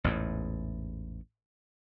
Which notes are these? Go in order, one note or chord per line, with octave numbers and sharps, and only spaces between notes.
A1 E2 G#2